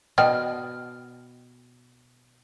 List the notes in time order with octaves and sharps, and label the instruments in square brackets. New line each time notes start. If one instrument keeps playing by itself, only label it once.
[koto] B2 [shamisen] D5 G5 [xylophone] F6